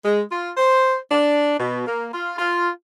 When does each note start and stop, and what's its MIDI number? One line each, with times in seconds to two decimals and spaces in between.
0.05 0.21 56
0.30 0.50 65
0.57 0.95 72
1.11 1.56 62
1.60 1.86 47
1.87 2.07 58
2.13 2.34 65
2.38 2.68 65